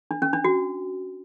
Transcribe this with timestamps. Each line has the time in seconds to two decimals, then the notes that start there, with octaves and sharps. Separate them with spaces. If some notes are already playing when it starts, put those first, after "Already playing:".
0.11 D4
0.22 C#4
0.33 D4
0.44 F#4